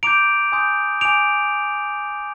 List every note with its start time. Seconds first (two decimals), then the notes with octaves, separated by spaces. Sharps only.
0.03 A#5 D6 G6 D7 F7
0.52 G#5 C6 D#6 G6
1.01 G#5 D6 G6 D7 F7